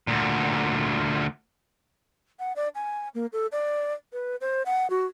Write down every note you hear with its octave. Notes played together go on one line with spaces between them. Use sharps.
D2 A#2
F#5
D5
G#5
A#3
A4
D5
B4
C5
F#5
F#4